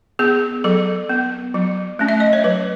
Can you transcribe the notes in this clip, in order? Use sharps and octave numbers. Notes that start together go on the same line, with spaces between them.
B3 G#4
F#3 A4
B3
F#3
A3 C#4
E5
D#5
C#5
F#3 B4